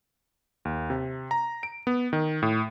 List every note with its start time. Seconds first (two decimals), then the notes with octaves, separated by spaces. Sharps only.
0.65 D#2
0.90 C3
1.31 A#5
1.63 D7
1.87 B3
2.13 D#3
2.42 A2